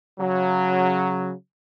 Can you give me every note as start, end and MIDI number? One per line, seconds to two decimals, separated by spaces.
0.19 1.31 49
0.19 1.31 54